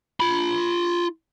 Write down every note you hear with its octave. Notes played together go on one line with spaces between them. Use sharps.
F4 B5